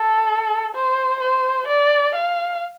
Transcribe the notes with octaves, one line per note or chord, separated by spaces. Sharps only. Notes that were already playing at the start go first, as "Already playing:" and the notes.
Already playing: A4
C5
C5
D5
F5